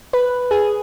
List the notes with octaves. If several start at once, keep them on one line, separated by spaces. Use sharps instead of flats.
B4
G#4